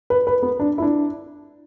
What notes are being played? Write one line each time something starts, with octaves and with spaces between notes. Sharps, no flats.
B4
B4
B3
D4
E4
D4